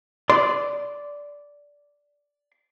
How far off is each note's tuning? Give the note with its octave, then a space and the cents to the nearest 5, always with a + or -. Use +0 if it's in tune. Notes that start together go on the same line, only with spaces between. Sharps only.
D5 -10 C6 -15